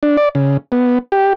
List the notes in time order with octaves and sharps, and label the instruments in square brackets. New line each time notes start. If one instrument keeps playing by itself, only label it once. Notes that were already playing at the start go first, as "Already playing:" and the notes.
[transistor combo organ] D4
D5
C#3
B3
G4